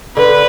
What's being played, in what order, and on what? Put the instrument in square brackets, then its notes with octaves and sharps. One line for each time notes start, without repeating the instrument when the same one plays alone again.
[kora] D3 [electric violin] B4